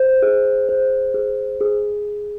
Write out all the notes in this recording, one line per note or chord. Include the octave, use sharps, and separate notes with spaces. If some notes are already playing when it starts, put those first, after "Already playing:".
Already playing: C5
G#4
C5
G#4
G#4